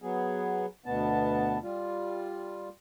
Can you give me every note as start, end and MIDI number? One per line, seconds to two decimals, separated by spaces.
0.02 0.66 54
0.02 0.66 59
0.02 0.66 68
0.86 1.58 38
0.86 1.58 47
0.86 1.58 59
0.86 1.58 81
1.63 2.69 55
1.63 2.69 65